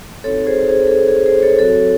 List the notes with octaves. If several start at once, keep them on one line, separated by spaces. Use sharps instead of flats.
C4 D#4 F#4 A4 C#5
G#4 C5
G#4 C5
A4
G#4
G#4
G#4 C5
A4 C#5
F#3 C4 F#4 A4 C#5